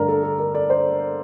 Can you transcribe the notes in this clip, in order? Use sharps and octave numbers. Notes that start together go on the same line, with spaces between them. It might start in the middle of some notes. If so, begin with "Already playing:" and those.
Already playing: G2 D3 A3 A#4 D5
A4
A4
A#4
D5
C5